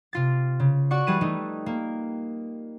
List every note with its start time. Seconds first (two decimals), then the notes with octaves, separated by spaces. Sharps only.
0.13 C3 F4 A6
0.60 C#3
0.91 F#4 D5 F#5 C#6
1.07 E3 G3 G#4 B4 D#7 E7
1.21 G3 A3 D#4
1.66 A#3